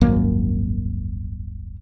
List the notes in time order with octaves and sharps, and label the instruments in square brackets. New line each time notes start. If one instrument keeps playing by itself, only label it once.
[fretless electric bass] D#1 G#1 F#2 A#3